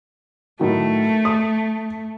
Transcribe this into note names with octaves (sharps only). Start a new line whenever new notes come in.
A2 D#3 F#3 A3
D#6